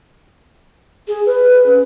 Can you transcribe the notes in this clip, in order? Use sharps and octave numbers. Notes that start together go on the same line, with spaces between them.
G#4
B4
C#4